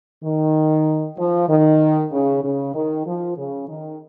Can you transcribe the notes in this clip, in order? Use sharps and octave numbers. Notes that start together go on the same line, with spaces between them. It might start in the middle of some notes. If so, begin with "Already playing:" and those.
D#3
F3
D#3
C#3
C#3
D#3
F3
C#3
D#3